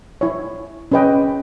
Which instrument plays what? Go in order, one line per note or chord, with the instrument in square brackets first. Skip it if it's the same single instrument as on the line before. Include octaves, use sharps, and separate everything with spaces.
[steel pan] E4 C#5
C#4 G#4 B4 D#5 G5